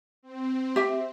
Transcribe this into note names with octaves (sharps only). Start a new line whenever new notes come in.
C4
G4 E5